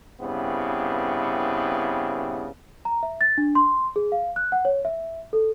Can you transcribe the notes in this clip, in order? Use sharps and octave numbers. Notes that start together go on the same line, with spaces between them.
G2 C#3 B3 C4 E4
A#5
E5
A6
D4
C6
G#4
F5
F#6
F#5
C#5
E5
A4